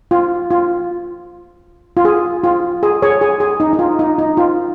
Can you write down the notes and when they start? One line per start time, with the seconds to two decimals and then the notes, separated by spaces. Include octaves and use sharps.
0.11 F4
0.50 F4
1.97 F4
2.05 G#4
2.44 F4
2.83 G#4
3.02 G#4 C#5
3.21 G#4
3.40 G#4
3.60 D#4
3.73 D#4
3.79 F4
3.99 D#4
4.19 D#4
4.37 F4